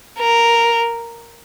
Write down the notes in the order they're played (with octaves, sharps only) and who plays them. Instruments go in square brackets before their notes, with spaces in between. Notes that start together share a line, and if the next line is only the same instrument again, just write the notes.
[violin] A#4